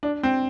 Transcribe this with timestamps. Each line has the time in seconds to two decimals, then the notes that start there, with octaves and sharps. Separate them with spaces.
0.03 D4
0.23 C4